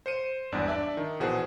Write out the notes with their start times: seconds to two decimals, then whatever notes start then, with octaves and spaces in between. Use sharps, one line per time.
0.06 C5 C#7 D#7
0.52 G#1 E2 G2 D4 D5
0.68 D4 D5 E5
0.97 D#3
1.20 A#1 B2 E3 G#4 C5 F#5